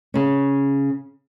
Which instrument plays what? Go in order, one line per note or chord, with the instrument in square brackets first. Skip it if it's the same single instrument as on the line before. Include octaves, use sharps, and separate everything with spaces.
[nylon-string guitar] C#3 C#4